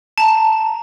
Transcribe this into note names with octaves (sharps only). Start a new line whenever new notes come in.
A5 A#5